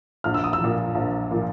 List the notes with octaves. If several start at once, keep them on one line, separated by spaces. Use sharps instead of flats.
A#1 F6
E6
D#6
E6
A#2 F3
A#1
A#2 F3